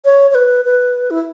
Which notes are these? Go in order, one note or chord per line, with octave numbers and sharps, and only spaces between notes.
C#5
C#5
B4
B4
E4